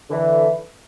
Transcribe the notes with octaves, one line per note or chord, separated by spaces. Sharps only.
D3 E3